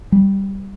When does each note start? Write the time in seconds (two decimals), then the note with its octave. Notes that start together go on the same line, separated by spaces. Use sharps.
0.12 G3